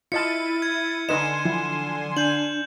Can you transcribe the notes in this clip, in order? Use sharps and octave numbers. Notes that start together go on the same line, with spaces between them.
E4 F4 D#5 A5 F6 A6 C#7 D#7
G#6
D3 D#4 B4 D#5 G#5 C6 E7
F3 E4
D4 G6 F#7